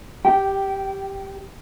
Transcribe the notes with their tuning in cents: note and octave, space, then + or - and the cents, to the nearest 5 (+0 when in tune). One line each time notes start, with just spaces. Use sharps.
G4 +0 G5 -15